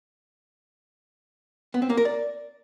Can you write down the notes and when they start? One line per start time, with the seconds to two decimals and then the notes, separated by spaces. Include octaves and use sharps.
1.74 B3
1.82 C4
1.90 A#3
1.97 A#4
2.05 D5